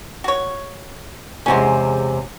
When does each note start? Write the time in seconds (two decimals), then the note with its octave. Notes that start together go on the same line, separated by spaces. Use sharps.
0.24 F#4 C#5
1.46 E2 C3 G#3 C#4 F#4